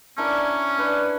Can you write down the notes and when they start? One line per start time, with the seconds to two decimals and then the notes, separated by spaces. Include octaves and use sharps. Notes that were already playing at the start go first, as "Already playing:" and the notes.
0.18 C#4 D4 E4 A#4
0.78 D4 B4